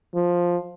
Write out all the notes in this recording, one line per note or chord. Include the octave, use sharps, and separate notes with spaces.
F3